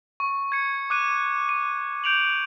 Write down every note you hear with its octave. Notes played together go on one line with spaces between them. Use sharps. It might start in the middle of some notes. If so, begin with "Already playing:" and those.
C#6
G#6 C#7
D6 F#6 D#7
D#7
G6 D7 F7 F#7